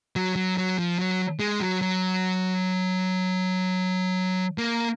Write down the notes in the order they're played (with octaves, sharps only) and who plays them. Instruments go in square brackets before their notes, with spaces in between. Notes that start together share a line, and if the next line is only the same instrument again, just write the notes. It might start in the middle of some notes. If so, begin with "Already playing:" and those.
[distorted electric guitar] F#3
F#3
F#3
F3
F#3
G#3
F#3
F#3
A#3